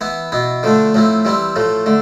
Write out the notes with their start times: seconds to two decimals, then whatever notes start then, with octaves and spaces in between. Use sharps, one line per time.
0.01 E3 B3 E4
0.32 B2 B3 E4
0.63 D3 F3 A3 D4
0.94 A2 F3 C4 E4
1.25 E3 G3 C4 E4
1.56 A2 F3 A3
1.86 D3 A3